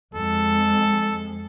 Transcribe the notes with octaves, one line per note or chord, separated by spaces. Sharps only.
F2 G#3 A4